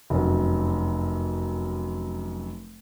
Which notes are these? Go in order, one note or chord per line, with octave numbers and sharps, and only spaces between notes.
F1 F#2